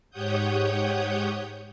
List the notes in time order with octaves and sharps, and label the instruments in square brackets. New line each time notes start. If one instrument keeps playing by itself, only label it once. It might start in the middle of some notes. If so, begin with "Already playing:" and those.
[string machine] G#2 G4 C#5 F#5 D#6 G6